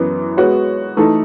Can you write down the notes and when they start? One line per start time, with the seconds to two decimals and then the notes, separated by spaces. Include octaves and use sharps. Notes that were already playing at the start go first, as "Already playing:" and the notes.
Already playing: F#2 E3 B3
0.37 G#3 B3 F#4 C#5
0.97 E3 A3 D#4 A4